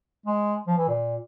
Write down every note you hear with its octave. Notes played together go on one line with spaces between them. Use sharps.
G#3
F3
E3
A#2